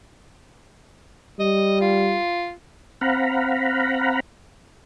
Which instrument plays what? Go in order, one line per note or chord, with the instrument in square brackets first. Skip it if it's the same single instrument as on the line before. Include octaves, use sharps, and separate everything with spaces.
[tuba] G3 [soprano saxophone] D#5
[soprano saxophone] F4
[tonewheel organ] C4 F5 F#5 A#5 B5